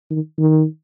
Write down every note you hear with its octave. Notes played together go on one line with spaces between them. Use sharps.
D#3
D#3